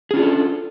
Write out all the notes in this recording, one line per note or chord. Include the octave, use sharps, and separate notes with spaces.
C#4 D4 F4 G#4 A4